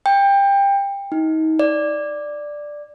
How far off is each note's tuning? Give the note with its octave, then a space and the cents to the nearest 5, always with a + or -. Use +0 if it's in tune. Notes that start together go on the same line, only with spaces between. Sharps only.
G5 +20
D#4 +30
D5 +5